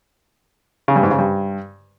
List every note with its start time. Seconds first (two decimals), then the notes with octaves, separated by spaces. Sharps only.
0.88 C#3
0.96 G2
1.03 G#2
1.11 C#3
1.18 G2